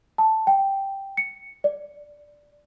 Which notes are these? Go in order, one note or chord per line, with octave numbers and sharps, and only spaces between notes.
A5
G5
C#7
D5